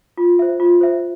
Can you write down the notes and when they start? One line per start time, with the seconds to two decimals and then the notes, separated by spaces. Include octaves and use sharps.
0.17 F4
0.39 C5 E5
0.60 F4
0.81 C5 E5